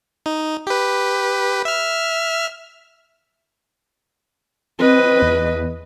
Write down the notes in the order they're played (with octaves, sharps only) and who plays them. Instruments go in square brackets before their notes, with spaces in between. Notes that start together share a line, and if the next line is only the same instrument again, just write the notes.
[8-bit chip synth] D#4
G4 B4
E5 F6
[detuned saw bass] C4 [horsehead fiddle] B4 D#5
[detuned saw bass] E2